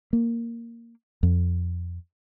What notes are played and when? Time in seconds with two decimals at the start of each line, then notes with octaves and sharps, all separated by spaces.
0.13 A#3
1.23 F2